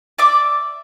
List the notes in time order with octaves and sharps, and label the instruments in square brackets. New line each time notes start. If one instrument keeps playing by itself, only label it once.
[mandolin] D5 E5 D6